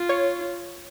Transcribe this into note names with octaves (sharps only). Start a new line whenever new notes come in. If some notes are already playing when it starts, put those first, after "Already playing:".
Already playing: F4
C#5